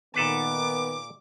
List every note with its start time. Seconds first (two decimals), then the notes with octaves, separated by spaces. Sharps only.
0.16 A#2 D#3 B3 A4 B4 D6